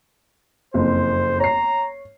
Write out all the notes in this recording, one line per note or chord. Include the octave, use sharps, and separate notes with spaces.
F#1 F2 C5
C#5 A#5 C7